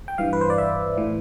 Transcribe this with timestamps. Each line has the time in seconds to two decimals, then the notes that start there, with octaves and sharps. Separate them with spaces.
0.08 G5
0.18 G2 E3 F5
0.33 B4
0.41 C5
0.50 D5
0.58 E5
0.97 A2 E3